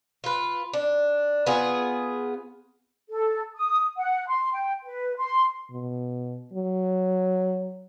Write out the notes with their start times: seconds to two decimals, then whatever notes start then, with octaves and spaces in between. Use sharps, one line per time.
0.24 F4 B4
0.74 D4
1.46 B3 F4 G#4
3.09 A4
3.57 D#6
3.97 F#5
4.28 C6
4.53 G5
4.83 B4
5.18 C6
5.71 B2
6.54 F#3